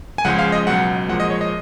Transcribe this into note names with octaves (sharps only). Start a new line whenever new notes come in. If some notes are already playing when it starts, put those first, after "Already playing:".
G#5
C#2 C#3 F3 G#3 F#5
F5
D#5
C#2 B2 F#3 F#5
A#2 F3 G#3 F#5
D#5
C#5
D#5